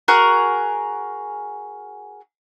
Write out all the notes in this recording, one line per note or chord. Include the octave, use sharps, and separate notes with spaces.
F#4 G#4 A#4 F#5